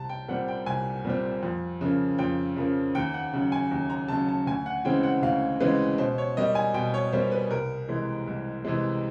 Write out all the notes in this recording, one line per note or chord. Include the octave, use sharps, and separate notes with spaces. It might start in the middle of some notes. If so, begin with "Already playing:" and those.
Already playing: C2 A5
G5
A#2 G3 C4 F#5
G5
C2 G#5
A#2 G3 C4
F2
C#3 F3 A#3
F2 G5
C#3 F3 A#3
D#2 G5
F#5
C#3 F#3
G#5
D#2
A#5
C#3 F#3 A5
A5
D2 G#5
F#5
C#3 E3 G#3 C4 G5
F#5
D2 F5
C#3 E3 G#3 C4 B4
B2 C5
C#5
G3 A#3 D#5
G#5
B2 G5
C#5
G3 A#3 C5
B4
C2 A#4
C3 E3 G#3
C2
C3 E3 G#3